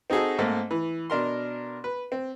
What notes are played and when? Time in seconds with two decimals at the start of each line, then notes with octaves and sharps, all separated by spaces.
0.10 C4 D#4 F#4 G#4 A4
0.38 G#2 A3 A#3 C4
0.71 E3
1.10 B2 D4 A#4 C6
1.84 B4
2.12 C4